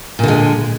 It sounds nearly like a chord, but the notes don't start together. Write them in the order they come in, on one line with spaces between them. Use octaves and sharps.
A#2 D3 G#3